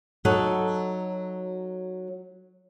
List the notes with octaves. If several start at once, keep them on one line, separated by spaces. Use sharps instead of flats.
F#3 D#4 F#4 A4